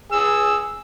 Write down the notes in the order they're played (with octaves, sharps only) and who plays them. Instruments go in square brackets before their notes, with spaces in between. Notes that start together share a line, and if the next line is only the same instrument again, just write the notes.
[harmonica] G#4 E6